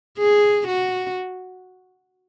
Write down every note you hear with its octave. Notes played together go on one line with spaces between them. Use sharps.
G#4
F#4